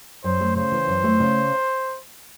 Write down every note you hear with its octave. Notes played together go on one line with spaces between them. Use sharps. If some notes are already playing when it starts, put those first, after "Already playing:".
F#2 C5
A3
C#3 C5
E3
F#2
A3
C#3